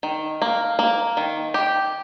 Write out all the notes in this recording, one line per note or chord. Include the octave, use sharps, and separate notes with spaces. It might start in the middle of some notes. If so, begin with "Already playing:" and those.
D#3
A#3
A#3
D#3
G4